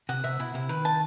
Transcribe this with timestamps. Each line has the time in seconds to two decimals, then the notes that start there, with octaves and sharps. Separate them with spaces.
0.09 C3 F#5
0.24 C3 E5
0.39 B2 E4
0.54 C3 E4
0.69 D#3 B4
0.85 A5